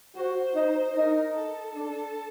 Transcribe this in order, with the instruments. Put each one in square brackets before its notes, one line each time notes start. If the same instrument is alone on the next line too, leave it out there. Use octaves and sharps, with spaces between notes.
[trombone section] F#4 [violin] C5
[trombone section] D#4
[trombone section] D#4 [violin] A#4
[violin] A4
[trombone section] D4